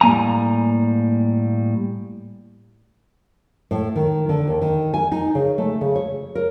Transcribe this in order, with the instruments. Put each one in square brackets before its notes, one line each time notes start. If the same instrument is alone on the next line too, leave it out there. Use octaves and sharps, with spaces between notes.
[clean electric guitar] A2 G3 A#3 G#5 A#5
[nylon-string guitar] A2
D#3
D3
D#2
D#3
G#5
D#4
C#3
A3
C#3
C#5
A#4